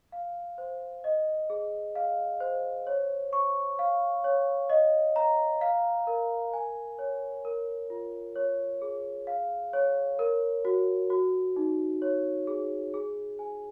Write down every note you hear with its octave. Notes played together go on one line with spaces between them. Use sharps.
F5
C5
D#5
G#4
F5
C5
C#5
C#6
F5
C#5
D#5
A#5
F5
A#4
G#5
C#5
A#4
F4
C#5
G#4
F5
C#5
A#4
F#4
F#4
D#4
C#5
G#4
G#4
G#5